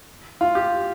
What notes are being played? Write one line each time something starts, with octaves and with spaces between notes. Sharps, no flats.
F4
G4